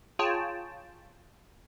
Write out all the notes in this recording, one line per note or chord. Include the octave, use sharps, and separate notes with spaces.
F4 G#4 C#5 G5 A5